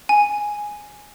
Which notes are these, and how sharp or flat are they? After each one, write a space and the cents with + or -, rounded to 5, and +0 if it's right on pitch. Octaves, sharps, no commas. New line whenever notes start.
G#5 +0